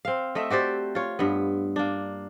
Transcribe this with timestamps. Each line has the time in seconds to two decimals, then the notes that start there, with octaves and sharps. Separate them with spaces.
0.05 C4 F5
0.35 A3 D#5 E5
0.50 F#4 G4 C5 D5
0.95 F4 C#5
1.19 G2 B3
1.76 A#3 D4